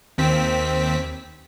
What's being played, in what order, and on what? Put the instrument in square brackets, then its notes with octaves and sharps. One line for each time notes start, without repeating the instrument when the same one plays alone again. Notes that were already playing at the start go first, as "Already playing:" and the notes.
[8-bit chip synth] D#2 C4 B6